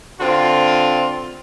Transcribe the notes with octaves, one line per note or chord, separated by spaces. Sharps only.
D3 C4 F4